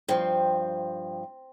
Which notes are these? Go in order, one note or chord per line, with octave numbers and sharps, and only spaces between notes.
G2 F3 C4